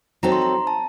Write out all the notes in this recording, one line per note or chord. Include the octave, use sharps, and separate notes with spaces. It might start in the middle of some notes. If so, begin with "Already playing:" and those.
F#3 C4 D#4 A4 A#5
C6
A#5
A5